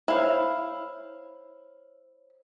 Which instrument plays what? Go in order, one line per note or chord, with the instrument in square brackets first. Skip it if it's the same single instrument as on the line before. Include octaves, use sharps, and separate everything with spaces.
[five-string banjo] E4 F5 [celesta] C5 C#5